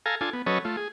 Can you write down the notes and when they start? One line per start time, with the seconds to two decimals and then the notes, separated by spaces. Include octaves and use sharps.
0.06 A4 F5 G#5 A#5
0.21 D4 F4 A4 G#5
0.33 B3
0.46 F#3 C#4 A4 B4 C#5 D#5
0.65 A3 F4
0.77 G#4